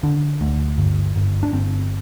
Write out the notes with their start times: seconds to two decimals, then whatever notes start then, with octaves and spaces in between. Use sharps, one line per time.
0.03 D3 D4
0.41 D2
0.78 G1
1.16 G1
1.43 D4
1.53 G1 C4